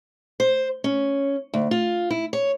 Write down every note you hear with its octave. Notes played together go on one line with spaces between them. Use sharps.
C5
C#4
D2
F4
E4
C#5